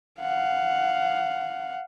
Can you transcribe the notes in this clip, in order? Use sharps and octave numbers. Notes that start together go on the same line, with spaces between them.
F5 F#5